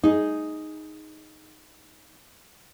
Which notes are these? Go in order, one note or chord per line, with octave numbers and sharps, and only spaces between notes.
D#4 G#4